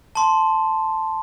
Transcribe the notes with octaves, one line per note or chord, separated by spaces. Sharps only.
A5 C6